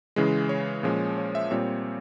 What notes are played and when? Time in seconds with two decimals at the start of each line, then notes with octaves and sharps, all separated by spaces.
0.16 C#3 E3 G#3
0.49 C#5
0.83 A#2 F3 G#3 C#4
1.18 C#5
1.35 E5
1.51 A#2 G3 C4 C#5